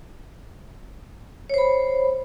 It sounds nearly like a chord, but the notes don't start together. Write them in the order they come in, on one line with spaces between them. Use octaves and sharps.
C#5 C5 B5